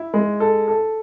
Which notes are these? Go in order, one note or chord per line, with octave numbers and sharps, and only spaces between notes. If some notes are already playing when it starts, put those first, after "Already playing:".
Already playing: E4
G#3
A4
A4